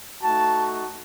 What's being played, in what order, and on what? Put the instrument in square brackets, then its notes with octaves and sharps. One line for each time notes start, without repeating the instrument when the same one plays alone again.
[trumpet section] A3 D#4 F#4 A5